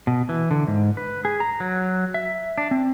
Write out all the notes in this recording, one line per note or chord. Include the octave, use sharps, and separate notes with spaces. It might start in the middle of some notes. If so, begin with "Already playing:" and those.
B2
E3
D3
G#2
B4
G#4
A#5
F#3
E5
D4
C4